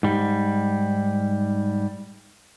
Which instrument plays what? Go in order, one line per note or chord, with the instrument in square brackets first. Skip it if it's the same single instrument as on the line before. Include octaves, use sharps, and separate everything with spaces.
[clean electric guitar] G#2 G3